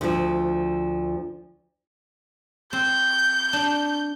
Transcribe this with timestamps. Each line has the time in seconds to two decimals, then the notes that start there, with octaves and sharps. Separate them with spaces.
0.01 D2 F3
2.73 C4 G6
3.53 D4